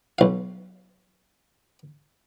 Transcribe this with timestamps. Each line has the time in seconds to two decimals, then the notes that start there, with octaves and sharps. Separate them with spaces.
0.19 B1 F5